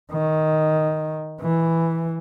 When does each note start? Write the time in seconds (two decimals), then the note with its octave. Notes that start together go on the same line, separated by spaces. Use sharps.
0.12 D#3
1.41 E3